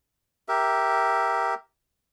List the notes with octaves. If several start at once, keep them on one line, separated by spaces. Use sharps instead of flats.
G4 A#4 E5